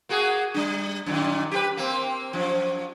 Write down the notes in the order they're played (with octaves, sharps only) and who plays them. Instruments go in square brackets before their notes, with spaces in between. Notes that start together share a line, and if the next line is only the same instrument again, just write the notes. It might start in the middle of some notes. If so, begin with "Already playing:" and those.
[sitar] A#3 F#4 G#4
G3 D4
F#2 A#2 D#3
G4 G#4 B4
A#3 C4
F#2 F3